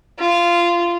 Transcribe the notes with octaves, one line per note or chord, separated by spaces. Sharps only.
F4